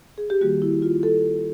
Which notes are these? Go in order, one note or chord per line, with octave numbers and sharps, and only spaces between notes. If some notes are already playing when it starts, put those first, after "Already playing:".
G#4
G4
D#3 G3 A#3 F#4
E4
F4
A4